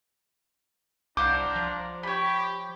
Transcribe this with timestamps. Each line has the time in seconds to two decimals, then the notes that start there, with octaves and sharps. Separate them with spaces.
1.17 C2 D4 C5 F5 F#5 A#5 D6
1.56 F3
2.03 G4 C#5 B5